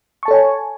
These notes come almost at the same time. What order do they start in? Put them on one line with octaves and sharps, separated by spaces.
C#6 A5 A4 C#5 G#5